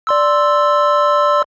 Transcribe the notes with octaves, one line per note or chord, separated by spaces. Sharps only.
D5 C6 E6